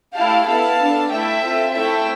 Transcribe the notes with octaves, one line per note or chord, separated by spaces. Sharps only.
A3 E4 G4 F5 A5
B3 E4 A4 F5 A5
B3 D4 A4
A3 E4 A4 E5 G5
C4 F4 A4
A3 C4 E4 A4 E5 G5